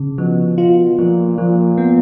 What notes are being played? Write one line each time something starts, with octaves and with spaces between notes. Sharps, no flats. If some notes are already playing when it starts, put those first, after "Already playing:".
Already playing: C#3
B2 F3
B2 F4
A#2 F3
A#2 F3
B3